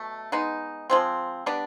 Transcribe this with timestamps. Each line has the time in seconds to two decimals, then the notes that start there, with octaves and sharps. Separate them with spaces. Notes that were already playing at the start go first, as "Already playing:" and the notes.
Already playing: B2 F#3 A3
0.32 G#3 B3 D#4
0.90 F3 G#3 C4
1.46 G3 B3 D4